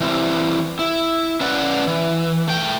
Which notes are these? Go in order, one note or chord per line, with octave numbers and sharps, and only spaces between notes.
E3 G3 C4 E4
E4
C#4 B4 D5 F#5
E3
A3 G5